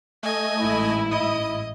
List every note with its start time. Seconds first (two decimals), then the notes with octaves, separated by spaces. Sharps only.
0.23 A3 D#5 G#5
0.61 A1 G#2 E4
1.11 D#5 D#6